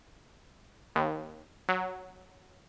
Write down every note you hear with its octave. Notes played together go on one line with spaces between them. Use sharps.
D#2
F#3